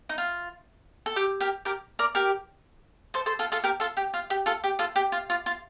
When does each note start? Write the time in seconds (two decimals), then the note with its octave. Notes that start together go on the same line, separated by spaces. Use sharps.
0.09 D#4
0.18 F4
1.06 A4
1.16 G4
1.41 G4 A#4
1.65 G4 A#4
1.99 A#4 D5
2.15 G4 A#4
3.14 A4 C5
3.26 A4 C5
3.39 F4 A4
3.52 F4 A4
3.64 G4 A#4
3.80 F4 A4
3.97 G4
4.14 F4
4.30 G4
4.46 F4 A4
4.64 G4
4.79 F4 A4
4.96 G4
5.12 F4
5.30 F4
5.46 F4